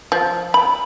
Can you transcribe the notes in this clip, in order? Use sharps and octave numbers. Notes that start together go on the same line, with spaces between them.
F3
B5